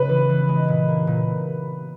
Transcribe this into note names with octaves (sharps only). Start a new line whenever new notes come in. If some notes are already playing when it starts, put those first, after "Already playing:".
Already playing: C#3 G#3 B4
E3
E3
G#3
A#2
A#3
A#2